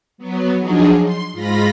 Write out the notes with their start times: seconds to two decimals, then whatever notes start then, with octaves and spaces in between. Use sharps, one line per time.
0.18 F#3 B3
0.59 F3 F#3 D4 D#4 G#4
1.02 C6
1.32 G#2 F4 B5 A#6